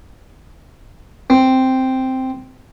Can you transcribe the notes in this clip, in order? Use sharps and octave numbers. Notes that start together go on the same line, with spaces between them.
C4